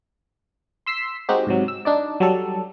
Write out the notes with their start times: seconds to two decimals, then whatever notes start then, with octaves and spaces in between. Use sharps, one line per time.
0.86 C6 E6 B6 C7
1.29 G#3 C4 D#4 F#4 G4
1.47 G#2 C3 F#3
1.68 E6
1.85 D4 D#4 D5
2.20 F#3 G3 A4